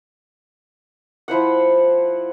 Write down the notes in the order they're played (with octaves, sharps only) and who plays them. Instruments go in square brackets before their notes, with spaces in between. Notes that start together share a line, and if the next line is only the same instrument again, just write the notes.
[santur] F3 E4 C5 F#5